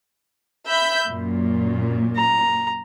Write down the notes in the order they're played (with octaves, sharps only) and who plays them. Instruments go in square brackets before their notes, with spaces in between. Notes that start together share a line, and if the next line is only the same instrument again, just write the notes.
[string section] E5 B5 G6
F#2 A#2
[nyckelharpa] A#5